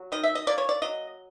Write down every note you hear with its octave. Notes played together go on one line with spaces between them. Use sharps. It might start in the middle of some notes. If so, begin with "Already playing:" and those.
Already playing: F#3
D#3 D#5
E5
D#5
A#3 D5
C#5
D5
F#3 D#5